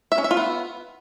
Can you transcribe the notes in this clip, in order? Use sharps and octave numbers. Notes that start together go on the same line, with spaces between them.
E5
C#4
E5
F4
B3